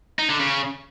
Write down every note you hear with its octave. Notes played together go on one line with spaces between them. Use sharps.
D#4
D3
C#3